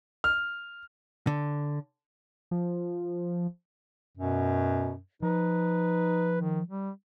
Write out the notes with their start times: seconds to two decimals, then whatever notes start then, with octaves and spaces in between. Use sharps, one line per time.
0.24 F6
1.27 D3
2.51 F3
4.17 F#2 B2
5.22 F3 D#4 B4
6.41 D#3
6.67 G3